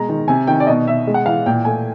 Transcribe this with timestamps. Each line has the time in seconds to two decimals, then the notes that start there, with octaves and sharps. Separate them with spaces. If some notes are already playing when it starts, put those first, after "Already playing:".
Already playing: B2 G#3 A#5
0.09 D#3
0.28 C3 G#5
0.47 D#3 G5
0.60 D5
0.67 B2 D#5
0.87 B2 E5
1.07 G#3
1.14 F#5
1.26 E3 F5
1.46 A#2 G5
1.65 A3 G#5